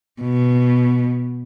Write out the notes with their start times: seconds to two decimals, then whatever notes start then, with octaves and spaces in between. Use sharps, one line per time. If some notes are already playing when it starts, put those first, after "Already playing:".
0.21 B2